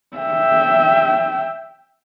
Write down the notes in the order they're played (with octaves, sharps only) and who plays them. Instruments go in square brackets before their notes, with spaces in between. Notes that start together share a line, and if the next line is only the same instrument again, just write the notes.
[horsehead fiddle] E5 G5